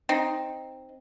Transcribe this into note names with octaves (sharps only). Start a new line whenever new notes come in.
C4 D#4